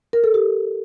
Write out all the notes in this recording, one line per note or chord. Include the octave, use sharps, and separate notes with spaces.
A#4
A4
G4